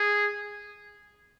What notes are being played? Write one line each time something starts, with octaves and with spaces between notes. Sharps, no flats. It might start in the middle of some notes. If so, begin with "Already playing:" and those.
Already playing: G#4